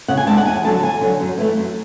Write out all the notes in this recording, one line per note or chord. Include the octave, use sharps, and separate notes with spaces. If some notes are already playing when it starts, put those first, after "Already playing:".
C#3 F#5
G#5
G#3 D4 A5
F#5
E2 G#5
D3 F#3 A5
E2 G#5
D3 F#3
F#2
E3 A3
F#2